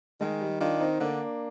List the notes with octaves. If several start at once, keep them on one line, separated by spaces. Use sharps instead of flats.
D#3 G#3
G3
D#3 D4 F4
C4 D#4
D3 A#3 D4